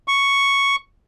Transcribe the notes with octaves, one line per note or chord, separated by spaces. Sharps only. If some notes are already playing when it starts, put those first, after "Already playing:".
C#6